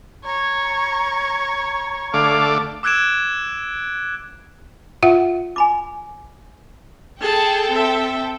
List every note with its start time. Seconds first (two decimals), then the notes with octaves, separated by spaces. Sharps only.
0.25 C#5 A#5
2.14 D3 A3 F5 D6
2.83 D6 E6 F#6 G#6 D7 E7
5.03 F4 E5 F#5
5.56 G#5 B5 D6
7.21 G#4 A4 G5 A5
7.71 C4 E5